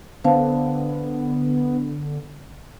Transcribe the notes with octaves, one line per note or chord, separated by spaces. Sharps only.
D3 B3 C5 F5 A5